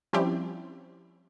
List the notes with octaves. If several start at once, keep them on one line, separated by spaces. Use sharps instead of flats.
F3 G3 C4 C#4 E4 G4